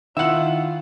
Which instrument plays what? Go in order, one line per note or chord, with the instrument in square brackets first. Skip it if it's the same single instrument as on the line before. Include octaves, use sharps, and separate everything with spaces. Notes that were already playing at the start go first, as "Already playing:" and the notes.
[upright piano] D#3 E4 F#7 [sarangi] F4 [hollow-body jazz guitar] E5 F#5